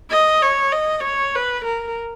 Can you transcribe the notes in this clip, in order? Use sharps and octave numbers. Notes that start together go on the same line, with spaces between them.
D#5
C#5
D#5
C#5
B4
A#4